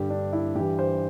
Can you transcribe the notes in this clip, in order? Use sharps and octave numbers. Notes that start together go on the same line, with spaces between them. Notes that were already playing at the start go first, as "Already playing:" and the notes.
Already playing: G2 D3 G4
D4
E4
G2 E3 G4
C5